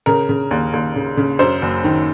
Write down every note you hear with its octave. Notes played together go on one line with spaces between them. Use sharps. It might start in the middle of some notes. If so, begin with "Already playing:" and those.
C#3 A#4
C#3
D#2
D#2
C#3
C#3
F#2 C5
F#1
D#3